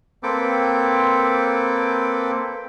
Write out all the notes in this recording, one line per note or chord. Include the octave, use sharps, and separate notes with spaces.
A#3 C4 A4 B4 G5 D6